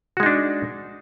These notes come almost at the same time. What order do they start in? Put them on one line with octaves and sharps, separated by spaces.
F#4 G#3 D#4 D4